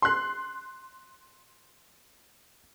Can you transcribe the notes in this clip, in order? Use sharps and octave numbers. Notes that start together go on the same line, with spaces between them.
C6 F#6